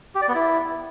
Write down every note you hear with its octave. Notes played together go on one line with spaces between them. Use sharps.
G4
D5
B3
E4